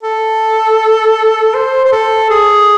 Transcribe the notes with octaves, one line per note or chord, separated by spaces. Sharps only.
A4
C5
C5
A4
G#4